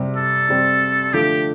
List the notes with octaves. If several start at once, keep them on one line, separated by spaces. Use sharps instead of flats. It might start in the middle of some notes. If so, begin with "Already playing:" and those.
Already playing: C3 G3 C4
A4
C3 G3 C4
D3 F3 A3 G4